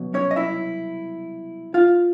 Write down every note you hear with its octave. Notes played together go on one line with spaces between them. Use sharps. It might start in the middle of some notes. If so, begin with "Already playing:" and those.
Already playing: C2 B2 F#3
C#4 C#5
D#5
E4 E5
F4 F5